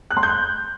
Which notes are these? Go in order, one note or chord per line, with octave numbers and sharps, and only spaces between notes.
F#6
C6
G6
F#6